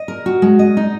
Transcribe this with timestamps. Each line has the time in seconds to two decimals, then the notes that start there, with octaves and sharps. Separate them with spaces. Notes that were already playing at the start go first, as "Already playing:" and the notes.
Already playing: D#5
0.08 A#4
0.26 F#4
0.42 G#3
0.59 D#5
0.77 D#4